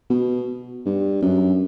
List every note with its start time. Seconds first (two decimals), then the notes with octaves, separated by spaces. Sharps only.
0.10 B2
0.86 G2
1.23 F#2